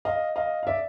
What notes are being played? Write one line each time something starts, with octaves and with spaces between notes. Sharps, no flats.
D#5 F5
D#5 F5
F5
D5 E5